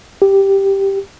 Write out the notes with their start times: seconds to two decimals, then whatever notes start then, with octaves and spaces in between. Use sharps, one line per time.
0.22 G4